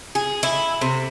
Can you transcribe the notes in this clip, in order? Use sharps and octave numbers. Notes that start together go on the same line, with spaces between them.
G#4
E4
C3